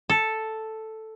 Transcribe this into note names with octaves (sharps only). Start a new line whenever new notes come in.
A4